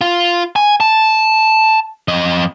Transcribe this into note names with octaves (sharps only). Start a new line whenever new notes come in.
F4
G#5
A5
F2 D#5